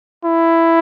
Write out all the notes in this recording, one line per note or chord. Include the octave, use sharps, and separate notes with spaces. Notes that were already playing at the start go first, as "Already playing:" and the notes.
E4